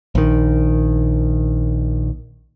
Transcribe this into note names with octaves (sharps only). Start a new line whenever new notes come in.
A#1 D#3